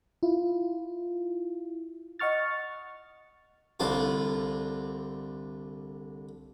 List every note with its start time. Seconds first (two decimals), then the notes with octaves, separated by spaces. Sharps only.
0.23 E4 F4
2.19 D#5 F#5 C#6 F6 A6
3.80 C2 D3 F4